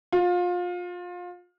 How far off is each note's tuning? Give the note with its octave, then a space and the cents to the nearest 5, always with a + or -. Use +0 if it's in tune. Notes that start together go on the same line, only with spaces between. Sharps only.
F4 +25